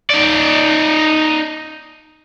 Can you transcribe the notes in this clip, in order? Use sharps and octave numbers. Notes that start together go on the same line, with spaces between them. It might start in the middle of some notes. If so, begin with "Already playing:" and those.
D#4 D5